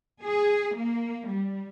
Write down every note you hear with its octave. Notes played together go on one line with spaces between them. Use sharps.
G#4
A#3
G3